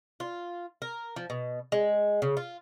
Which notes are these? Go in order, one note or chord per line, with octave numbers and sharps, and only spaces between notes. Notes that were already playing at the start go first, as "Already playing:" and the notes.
F4
A#4
F3
B2
G#3
C#3
F4